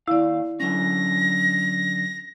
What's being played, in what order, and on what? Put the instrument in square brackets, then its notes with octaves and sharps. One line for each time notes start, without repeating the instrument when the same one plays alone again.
[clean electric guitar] D#2 F5 [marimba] E4 D5
[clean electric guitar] D3 F#3 C#4 [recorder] A#6